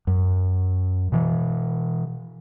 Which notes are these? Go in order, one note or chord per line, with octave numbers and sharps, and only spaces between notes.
F#2
B2 E3